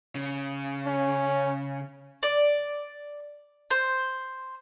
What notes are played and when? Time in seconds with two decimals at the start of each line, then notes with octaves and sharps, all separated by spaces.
0.15 C#3
0.87 C#4
2.23 D5
3.71 C5